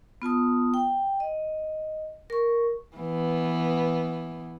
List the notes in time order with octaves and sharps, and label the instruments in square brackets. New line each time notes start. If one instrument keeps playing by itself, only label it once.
[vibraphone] B3 F4 A5 D#6
G5
D#5
A#4 C#6
[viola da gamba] E3 B3